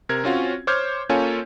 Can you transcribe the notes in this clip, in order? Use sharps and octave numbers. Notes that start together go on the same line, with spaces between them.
C3 A#4 G#6
C4 C#4 F4 F#4
C5 C#5 D6 F6 G6 G#6
A#3 C#4 F4 A4 C#5 G#5